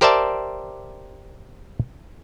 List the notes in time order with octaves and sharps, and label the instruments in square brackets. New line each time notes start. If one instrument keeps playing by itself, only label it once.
[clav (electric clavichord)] G4 A#4 C5 D5 E5 A5